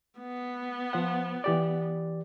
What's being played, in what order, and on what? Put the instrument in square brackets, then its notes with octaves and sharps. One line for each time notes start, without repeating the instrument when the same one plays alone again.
[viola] B3
[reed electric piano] F3 C5 F#5
E3 G4 D5